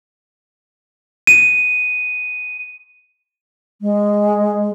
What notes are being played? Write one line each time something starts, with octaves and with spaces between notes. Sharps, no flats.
D#7
G#3